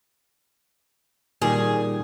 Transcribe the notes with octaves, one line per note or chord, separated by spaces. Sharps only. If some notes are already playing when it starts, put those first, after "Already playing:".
A#2 D#3 G3 G#4